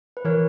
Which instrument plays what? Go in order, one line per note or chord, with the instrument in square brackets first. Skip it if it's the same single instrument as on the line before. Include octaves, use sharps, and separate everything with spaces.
[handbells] B4
[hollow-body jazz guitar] E3 [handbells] A#4 C#5